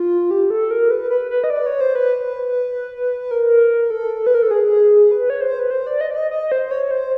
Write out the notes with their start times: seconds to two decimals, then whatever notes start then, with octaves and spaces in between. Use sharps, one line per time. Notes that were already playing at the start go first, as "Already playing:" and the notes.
Already playing: F4
0.31 G4
0.50 A4
0.71 A#4
0.91 B4
1.10 B4
1.31 B4
1.44 D#5
1.50 D5
1.66 C#5
1.81 C5
1.95 B4
3.31 A#4
3.90 A4
4.27 B4
4.35 A#4
4.43 A4
4.51 G#4
5.11 B4
5.30 C#5
5.41 C5
5.59 B4
5.71 C5
5.87 D5
6.01 D#5
6.11 D5
6.17 D#5
6.31 D#5
6.52 C5
6.71 C#5
6.91 C5